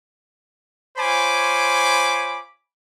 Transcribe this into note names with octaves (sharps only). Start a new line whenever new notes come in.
F4 C5 C#5 G#5 B5 D6